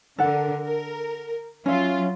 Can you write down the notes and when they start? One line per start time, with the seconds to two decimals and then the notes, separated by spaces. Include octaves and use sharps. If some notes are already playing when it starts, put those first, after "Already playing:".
0.18 D3 A4 A#4 F#5
0.63 A#4
1.66 F#3 C#4 F4 E5